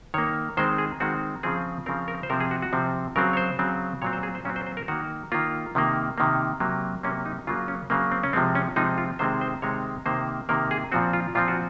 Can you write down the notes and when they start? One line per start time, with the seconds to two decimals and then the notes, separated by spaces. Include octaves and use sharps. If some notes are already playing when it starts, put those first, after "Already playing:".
0.14 D#3 A#3 C#5
0.57 D#3 G#3 C4 C5
0.78 G#4
1.00 D#3 G#3 C4 F#4
1.43 C#3 F3 C4 G#4
1.86 C#3 F3 C4 A#4
2.08 A#4
2.23 C5
2.30 C3 F3 C4 A#4
2.40 G#4
2.51 F#4
2.62 F#4
2.73 C3 F3 C4
3.16 C#3 F#3 C4 A#4
3.33 C#5
3.37 C5
3.59 C#3 F#3 C4
4.02 A#2 F#3 C4 C#5
4.13 C5
4.23 G#4
4.35 C5
4.45 A#2 F#3 C4 C#4
4.56 C5
4.67 C5
4.77 A#4
4.88 D#3 A#3 F#4
5.32 D#3 A#3 F4
5.75 C3 D#3 A#3
6.18 C3 D#3 A#3
6.60 C3 F#3 A#3
7.03 C3 F#3 A#3 C#4
7.26 D#4
7.47 C#3 F#3 A#3 F4
7.68 C#4
7.90 C#3 F#3 A#3 C4
8.12 C4
8.24 C#4
8.33 C3 F3 G#3 C4
8.55 C#4
8.76 C3 F3 G#3 C4 D#4
8.98 F4
9.19 C3 D#3 G#3 C4 C5
9.41 C5
9.62 C3 D#3 G#3 C4 C#5
10.06 C3 D#3 A#3 C5
10.49 C3 D#3 A#3 A#4
10.71 G#4
10.92 A#2 F3 C4 F#4
11.13 F4
11.35 A#2 F3 C4 F4
11.48 F#4